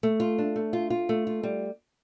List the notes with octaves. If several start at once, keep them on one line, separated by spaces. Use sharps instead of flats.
A3
F4
D4
A3
F4
F4
A3
F4
G3